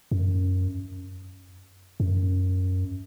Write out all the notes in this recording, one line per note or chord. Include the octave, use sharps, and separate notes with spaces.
F#2
F#2